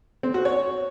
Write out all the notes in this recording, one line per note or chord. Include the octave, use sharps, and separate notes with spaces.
C4
F#4
C#5